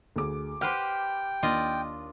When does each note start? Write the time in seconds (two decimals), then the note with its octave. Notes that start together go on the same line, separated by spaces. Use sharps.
0.16 D2 G#4 D6
0.61 G4 B4 C5 F#5 G5 F6
1.43 D#2 D4 F4 D#5